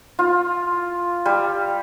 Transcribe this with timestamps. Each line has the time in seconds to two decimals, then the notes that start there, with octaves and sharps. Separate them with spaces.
0.19 F4
1.26 G3